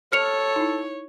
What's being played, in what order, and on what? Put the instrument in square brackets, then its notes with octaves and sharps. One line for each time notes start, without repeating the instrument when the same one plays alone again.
[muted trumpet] A4 [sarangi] C#5 [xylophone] F6 C#7 F7
[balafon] D#4 E4